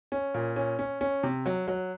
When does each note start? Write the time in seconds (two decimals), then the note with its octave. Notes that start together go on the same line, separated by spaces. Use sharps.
0.12 C#4
0.34 A#2
0.56 C#4
0.79 C#4
1.01 C#4
1.23 C3
1.46 F#3
1.68 F#3